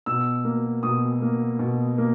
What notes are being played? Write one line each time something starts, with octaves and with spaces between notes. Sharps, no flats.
B2 E6
A#3
B2 D#6
A#3
B2
A#3